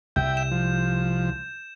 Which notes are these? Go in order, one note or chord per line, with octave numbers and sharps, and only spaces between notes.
C2 E5 G5 G6
E7
F3